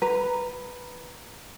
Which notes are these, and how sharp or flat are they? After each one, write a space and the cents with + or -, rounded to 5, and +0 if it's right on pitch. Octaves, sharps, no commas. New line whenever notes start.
B4 +0 A#5 +0